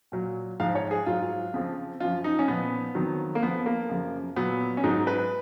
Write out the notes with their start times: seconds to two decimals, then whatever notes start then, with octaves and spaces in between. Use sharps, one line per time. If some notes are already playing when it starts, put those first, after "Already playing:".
0.12 A#2 F#3
0.60 G#2 F3 F5
0.75 C#5
0.91 G#4
1.06 G#2 F#3 F4
1.54 F2 C#3 F3
2.00 F#2 F3 F4
2.24 D#4
2.39 C#4
2.48 A#2 F3 B3
2.95 F2 D#3 F#3
3.35 A#3
3.42 F2 F3 B3
3.66 A#3
3.89 F#2 C#3 F3
4.36 A#2 F#3 B3
4.77 C#4
4.84 G#2 F#3 D#4
5.07 B4